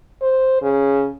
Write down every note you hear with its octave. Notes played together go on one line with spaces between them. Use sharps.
C5
C#3